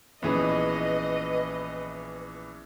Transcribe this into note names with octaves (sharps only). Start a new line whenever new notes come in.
A#1 E3 B3 C#4 G#4 B4 D#5